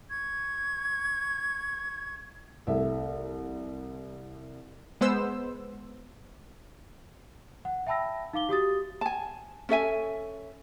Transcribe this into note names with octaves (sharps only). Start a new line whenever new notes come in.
C#6 G#6
C2 A3 E5
G#3 B3 C5 E6
F#5
E5 G5 A5 B5 E6 A#6
D#4 F5 D6 G7
F#4 G4 D#6 A6
G#5 A5
C#4 A4 E5 G#5